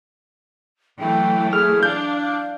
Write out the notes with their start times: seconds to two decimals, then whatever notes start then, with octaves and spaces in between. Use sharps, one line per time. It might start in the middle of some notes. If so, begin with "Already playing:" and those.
0.99 E3 F#3 A3 G5
1.53 G#4 F6
1.83 D4 F5 G6
2.21 F5